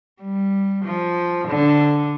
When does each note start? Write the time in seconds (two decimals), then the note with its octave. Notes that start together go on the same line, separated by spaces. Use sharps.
0.22 G3
0.85 F3
1.48 D3